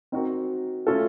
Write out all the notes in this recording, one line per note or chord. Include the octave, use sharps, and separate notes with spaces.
C4 D#4 F#4 A#4
A3 C#4 F4 A4